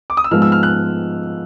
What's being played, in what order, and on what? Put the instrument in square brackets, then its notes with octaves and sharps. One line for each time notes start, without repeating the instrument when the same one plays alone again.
[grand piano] D6
D#6
E6
[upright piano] G#2 F3 G#3 B3 [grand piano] F6
[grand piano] E6
F6
F#6